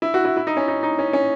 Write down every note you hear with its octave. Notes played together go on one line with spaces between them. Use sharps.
E4
F#4
E4
E4
D#4
C#4
D#4
D#4
C#4
C#4